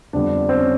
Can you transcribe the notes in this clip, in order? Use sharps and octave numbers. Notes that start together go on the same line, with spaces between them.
F2 D3 G3 B3 D4
C4
C#4